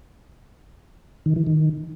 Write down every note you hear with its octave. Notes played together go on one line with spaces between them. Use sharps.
D#3
E3
D#3